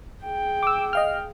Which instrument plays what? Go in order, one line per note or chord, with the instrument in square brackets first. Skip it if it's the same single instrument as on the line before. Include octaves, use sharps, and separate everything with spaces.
[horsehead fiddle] G#4 G5
[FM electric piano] D6 E6
D#5 F5 F6